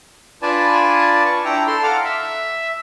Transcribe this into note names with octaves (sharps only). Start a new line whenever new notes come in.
D4 F4 B4 D5 G#5 A5
C#6
D4 E4 G5 A#5
A4 C6
F5 F#5 A#5 D6 F6
E5